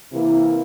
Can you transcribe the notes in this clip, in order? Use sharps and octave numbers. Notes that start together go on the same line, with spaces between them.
C3 E3 A#3 E4